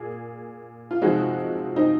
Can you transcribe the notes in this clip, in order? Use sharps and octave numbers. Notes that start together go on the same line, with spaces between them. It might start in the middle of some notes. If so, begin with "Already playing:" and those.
Already playing: A#2 G#4
F4
C3 F3 G#3 D#4 F#4
C4 D#4